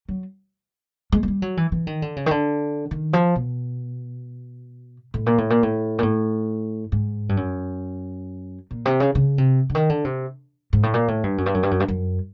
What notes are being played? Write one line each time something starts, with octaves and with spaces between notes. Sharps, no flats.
F#3
G#3
G#3
G3
F#3
E3
E3
D#3
D3
C#3
D#3
D3
D#3
F3
B2
A2
A#2
A2
A#2
A2
A#2
A2
G#2
G2
F#2
A#2
C3
C#3
C#3
C3
D3
D#3
D3
C3
G#2
A2
A#2
A2
G2
F#2
G2
F#2
G2
F#2
G2
F#2